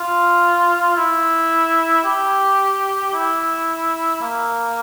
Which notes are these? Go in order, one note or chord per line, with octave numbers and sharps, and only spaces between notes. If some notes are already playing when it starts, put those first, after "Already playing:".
Already playing: F4
E4
G4
E4
A#3